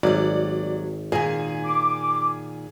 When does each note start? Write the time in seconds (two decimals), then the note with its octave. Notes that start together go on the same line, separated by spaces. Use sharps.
0.03 G#1 F#3 G3 D5
1.12 A#2 D#3 G#4 G#5
1.64 D6